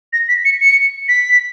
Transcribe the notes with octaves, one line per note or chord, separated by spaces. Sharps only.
A#6
B6
C#7
C#7
B6